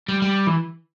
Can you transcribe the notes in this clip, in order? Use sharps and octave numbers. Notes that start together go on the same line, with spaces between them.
G3
G3
E3